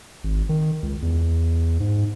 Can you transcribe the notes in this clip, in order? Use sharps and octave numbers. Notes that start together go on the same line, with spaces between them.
G#1
D#3
C#2
E2
G#2